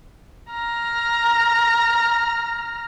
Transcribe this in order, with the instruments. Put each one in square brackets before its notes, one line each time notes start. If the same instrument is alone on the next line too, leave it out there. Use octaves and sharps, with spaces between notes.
[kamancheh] A#5 F6